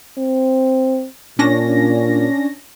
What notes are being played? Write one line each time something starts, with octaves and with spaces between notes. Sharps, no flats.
C4
A#2 C#4 D4 A#6